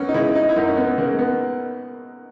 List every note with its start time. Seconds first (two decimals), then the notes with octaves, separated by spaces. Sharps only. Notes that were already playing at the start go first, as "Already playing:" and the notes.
Already playing: F#2 B3 C#4
0.09 D#4
0.14 C#3 G#3 E4
0.35 D#4
0.49 E4
0.56 F#2 D#4
0.68 C#4
0.77 B3
0.98 C#3 G#3 A#3
1.19 B3